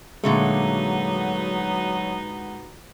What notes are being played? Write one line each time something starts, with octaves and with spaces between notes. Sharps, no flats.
A#2 D3 F#3 G#3 A3 B3 D#4 F#4